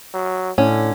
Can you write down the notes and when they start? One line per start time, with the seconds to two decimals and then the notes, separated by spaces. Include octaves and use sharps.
0.14 F#3
0.58 A2 D3 C#4